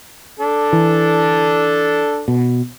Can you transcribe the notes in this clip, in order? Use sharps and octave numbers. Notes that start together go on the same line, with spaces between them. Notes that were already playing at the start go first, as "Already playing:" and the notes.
D4 A4
E3
B2